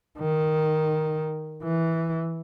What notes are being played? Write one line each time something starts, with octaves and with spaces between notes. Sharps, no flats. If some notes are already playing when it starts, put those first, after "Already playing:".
D#3
E3